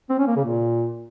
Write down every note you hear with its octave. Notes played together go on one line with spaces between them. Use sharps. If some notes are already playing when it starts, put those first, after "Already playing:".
C4
C#4
A#3
C#3
A#2